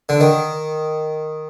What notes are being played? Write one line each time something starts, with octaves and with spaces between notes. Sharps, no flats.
D3
D#3